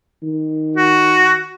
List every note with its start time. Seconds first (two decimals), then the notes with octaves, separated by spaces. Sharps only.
0.23 D#3
0.76 F#4